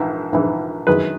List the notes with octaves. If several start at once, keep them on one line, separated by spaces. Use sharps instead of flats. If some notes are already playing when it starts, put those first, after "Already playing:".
Already playing: A#1 G#2 E3
A#1 G#2 E3
F#2 D#3 G#3 B4